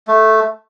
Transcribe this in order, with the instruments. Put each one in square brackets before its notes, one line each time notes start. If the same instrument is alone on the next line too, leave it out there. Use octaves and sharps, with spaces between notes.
[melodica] A3